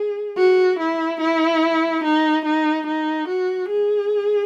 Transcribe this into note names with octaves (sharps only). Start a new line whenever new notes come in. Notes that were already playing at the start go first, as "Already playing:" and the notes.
Already playing: G#4
F#4
E4
E4
D#4
D#4
D#4
F#4
G#4